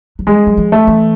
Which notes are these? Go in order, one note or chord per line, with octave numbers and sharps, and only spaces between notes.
F#3
G3 G#3
F#3
F3
A3
E3